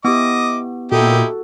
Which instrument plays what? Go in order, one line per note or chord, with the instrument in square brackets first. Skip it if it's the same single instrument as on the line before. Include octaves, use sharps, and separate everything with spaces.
[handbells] B3 [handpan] E4 G4 [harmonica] D#5 D6
[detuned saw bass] A#2 [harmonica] D#4 E4 G4 [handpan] F#4 A4